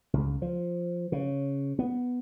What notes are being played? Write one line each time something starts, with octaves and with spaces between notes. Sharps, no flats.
C#2
F3
C#3
B3